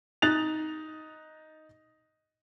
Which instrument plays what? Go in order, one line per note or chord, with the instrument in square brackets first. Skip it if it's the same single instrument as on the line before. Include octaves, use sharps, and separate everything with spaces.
[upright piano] D#4 F#6 A6 F7